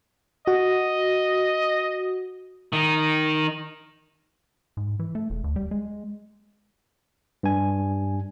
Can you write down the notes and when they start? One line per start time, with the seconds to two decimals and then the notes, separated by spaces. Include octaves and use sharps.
0.47 F#4 D#5
2.73 D#3 D#4
4.77 G#2
4.99 E3
5.15 A3
5.30 E1
5.44 D2
5.56 G3
5.71 G#3
7.43 G2 G#5